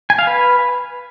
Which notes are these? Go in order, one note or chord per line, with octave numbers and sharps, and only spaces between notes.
G#5
F5
B4